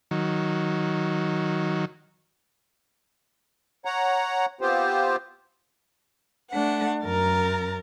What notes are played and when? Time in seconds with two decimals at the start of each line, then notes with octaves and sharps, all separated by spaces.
0.11 D#3 F#3
3.85 C#5 F#5 A#5
4.61 B3 C4 F4 G4 C5
6.51 A3 D4 F#5
7.05 F#2 A#4 A#5 A6